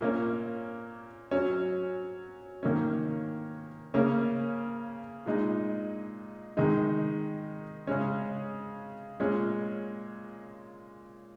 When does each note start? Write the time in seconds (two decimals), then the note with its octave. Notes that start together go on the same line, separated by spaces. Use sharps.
0.01 A#2 A#3 C#4
1.31 F#3 C#4
2.63 D#3 A#3 C#4
3.94 C#3 A#3 C#4
5.26 A#2 G#3 D#4
6.57 D#3 G#3 D#4
7.87 C#3 G#3 C#4
9.20 A#2 G#3 C#4